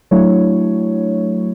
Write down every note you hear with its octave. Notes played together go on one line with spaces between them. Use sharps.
F#3 A3 D4 E4 C#5